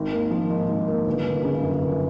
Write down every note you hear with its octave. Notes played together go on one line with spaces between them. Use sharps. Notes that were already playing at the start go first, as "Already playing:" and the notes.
Already playing: G#1
A#3
F3
G#2
G#1
A#3
G1
G1
C#3
F#2
G1